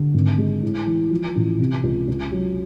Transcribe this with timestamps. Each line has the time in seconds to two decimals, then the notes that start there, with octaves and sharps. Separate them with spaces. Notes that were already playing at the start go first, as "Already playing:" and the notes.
Already playing: D3
0.14 G#1
0.38 G#3
0.62 A2
0.87 E3
1.11 F3
1.36 A1
1.59 C3
1.83 C#2
2.08 C#2
2.31 F#3